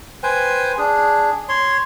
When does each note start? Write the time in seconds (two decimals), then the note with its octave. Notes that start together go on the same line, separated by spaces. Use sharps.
0.23 B4 C5 G5 G#5
0.78 D4 G#4
1.49 C#5 C6